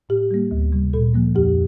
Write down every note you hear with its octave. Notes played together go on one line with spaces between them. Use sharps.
A2 G4
G3 A#3
D2
C3 G3
A#2 A4
F3 A#3
F2 G4